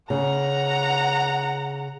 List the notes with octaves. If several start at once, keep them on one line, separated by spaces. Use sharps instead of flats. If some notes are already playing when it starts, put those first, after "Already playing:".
C#3 F#5 A#5